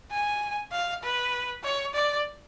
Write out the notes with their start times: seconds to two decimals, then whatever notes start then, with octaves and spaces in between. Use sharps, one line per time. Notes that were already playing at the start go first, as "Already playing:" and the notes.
0.11 G#5
0.72 F5
1.03 B4
1.64 C#5
1.94 D5